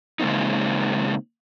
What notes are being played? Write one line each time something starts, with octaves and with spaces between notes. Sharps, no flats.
C#3 G#3 A#3 C4 D#4